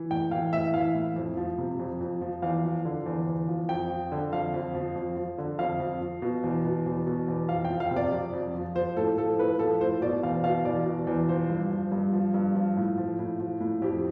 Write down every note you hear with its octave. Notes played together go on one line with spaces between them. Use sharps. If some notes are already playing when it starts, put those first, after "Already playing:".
Already playing: E3
A2 G5
E3 F5
A2 E5
E3 F5
A2
F2
F3
C3
F2
F2
F3
E2 F5
F3
D3
E2
E2
F3
F2 G5
F3
D3
F2 F5
F2
F3
F2
F3
D3
F2 F5
F2
F3
B2
E2
B2
E2
B2
E2
F2 F5
G5
F3
F5
C3
D5
F2
F2
F3
F3 C5
A2 A4
F3 A4
A2 B4
F3 A4
A2 C5
B2 D5
E2 F5
B2 F5
E2 D5
B2
E2
F3 C5
G2
F3
G2
F3
G2
F3
A2
F3
A2
F3
A2
F2 G4